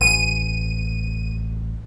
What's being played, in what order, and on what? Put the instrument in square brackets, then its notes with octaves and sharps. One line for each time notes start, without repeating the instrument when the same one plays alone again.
[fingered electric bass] A1 [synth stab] D#7